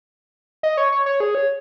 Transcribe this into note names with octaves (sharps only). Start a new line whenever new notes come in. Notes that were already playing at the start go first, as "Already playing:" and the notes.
D#5
C#5
C#5
C#5
G#4
C#5